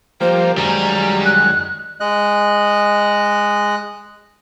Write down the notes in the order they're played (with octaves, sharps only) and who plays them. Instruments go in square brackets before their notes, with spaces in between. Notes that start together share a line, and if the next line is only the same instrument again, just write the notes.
[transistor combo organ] F3 G3 A#3 [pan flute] C5
[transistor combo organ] F#2 D#3 G#3 [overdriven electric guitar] G3 [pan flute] A#5
[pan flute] F#6
[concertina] G#3 D#5 F#6